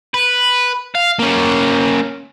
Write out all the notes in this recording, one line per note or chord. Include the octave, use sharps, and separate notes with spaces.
B4
F5
A#3 C#4